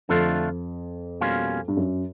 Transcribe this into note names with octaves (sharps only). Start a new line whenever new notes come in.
F2 D3 F3 A3 D4 F4
B2 G3 A#3 C#4 F4
G2
F#2